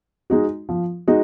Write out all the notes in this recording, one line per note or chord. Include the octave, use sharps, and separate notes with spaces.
G#3 D#4 F#4
F3
G#3 D#4 F#4